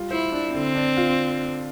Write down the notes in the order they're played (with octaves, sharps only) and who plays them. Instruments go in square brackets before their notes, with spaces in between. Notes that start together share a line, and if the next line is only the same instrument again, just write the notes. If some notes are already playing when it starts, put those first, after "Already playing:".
Already playing: [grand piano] G3 F4
[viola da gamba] E4 [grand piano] C5
[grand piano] D4
[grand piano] D3 [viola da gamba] C4
[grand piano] D4
F4